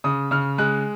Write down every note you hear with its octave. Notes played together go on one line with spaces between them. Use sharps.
C#3 D#6
C#3 F6
G#3 F#6